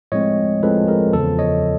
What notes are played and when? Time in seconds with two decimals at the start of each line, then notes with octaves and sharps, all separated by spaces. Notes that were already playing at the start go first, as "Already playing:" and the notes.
0.12 A2 F3 G#3 C4 C#5 D#5
0.63 A2 F3 G#3 C4 A4 B4
0.87 G#4 A#4
1.13 E2 C#3 F3 A4
1.39 C#5 D#5